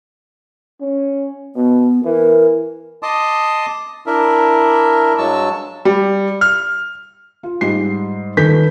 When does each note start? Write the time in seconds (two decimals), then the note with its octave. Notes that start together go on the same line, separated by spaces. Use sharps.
0.80 C#4
1.56 B2 B3
2.05 E3 A#4
3.03 D#5 A5 C6 D6 D#6
4.06 D4 E4 A#4 E5
5.18 G2 F#3 G#3 A5 C#6 E6
5.85 G3
6.41 F6
7.43 F4
7.61 G#2 G3 C7
8.37 D#1 D#3 A4 B4 G6 B6